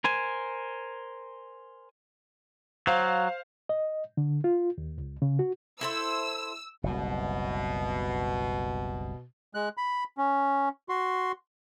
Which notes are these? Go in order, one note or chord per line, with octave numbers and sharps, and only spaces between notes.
A#4 C5 G#5
F#3 C5 F5
D#5
D3
F4
D#2
C#2
C#3
F#4
E4 A4 C5 E6
F#1 C2 B2
G#3 F#6
B5
C#4
F#4 C6